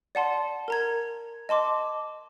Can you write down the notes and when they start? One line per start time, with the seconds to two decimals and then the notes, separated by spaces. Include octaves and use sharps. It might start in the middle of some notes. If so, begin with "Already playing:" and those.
0.15 D5 F#5 A5 C6
0.68 A#4 A#5 G#6
1.49 D#5 A5 C6 D6